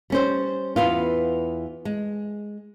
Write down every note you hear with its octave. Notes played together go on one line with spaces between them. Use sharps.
G3 C#4 C5
E2 B3 F4
G#3